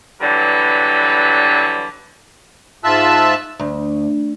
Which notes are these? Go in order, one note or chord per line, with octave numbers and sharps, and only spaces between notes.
D3 E3 F#3 G3 B4
G#2 F4 E5 A5 E6 F#6
D2